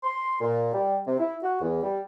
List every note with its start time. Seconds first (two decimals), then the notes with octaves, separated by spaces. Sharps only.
0.04 C6
0.41 A#2
0.74 G3
1.07 C3
1.20 E4
1.43 F#4
1.62 E2
1.83 G3